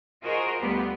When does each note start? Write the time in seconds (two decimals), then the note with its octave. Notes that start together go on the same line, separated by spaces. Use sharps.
0.24 F4 F#4 G#4 A#4 C5 D#5
0.60 D2 G3 B3 F4 G4